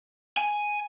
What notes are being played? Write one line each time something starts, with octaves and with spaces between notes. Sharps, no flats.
G#5